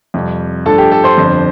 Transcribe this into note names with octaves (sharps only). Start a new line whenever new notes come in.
F2 C3 G3
G2 F3 A3 D4 A4 A5
G4 G5
A4 A5
C5 C6
G1 F2 F3 D4